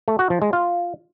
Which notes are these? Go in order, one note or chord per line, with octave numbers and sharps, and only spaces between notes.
A3
F#4
F3
G#3
F4